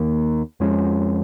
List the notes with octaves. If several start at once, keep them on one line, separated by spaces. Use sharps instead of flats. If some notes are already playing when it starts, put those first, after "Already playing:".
Already playing: D#2 D#3 A#3
F2 F3 G#3 C#4